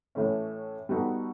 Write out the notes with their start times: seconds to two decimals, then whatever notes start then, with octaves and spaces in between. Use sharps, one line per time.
0.15 A2 E3 A3 C#4
0.89 G3 B3 D#4 F#4 A4